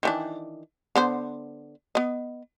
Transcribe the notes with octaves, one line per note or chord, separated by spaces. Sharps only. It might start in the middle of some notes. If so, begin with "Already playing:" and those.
D#3 E3 D4
D3 B3 C5
B3 D#5